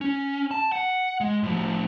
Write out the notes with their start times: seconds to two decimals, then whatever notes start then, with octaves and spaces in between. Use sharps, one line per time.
0.01 C#4
0.51 A5
0.72 F#5
1.21 G#3
1.43 A2 F3